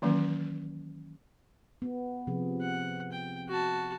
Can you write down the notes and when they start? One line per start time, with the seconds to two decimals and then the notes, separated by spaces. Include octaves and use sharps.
0.02 D#3 E3 F#3 A#3 C#4
1.82 B3
2.27 C3 F3 G#4
2.61 F#5
3.12 G5
3.49 F#4 A5